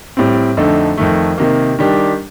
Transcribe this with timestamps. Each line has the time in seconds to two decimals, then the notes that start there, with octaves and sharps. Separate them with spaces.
0.17 A2 G3 C4
0.57 F2 D3 A3 D#4 A4
0.97 F2 D#3 A3
1.38 C3 D#3 A#3
1.79 D#3 G3 D4 G4